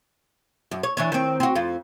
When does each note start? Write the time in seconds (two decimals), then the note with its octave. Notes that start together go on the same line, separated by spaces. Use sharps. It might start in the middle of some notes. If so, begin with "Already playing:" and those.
0.71 F#2
0.83 C#5
0.97 E3 D4 C#5
1.12 D#3 C4
1.40 C4 F#4
1.56 F2 F4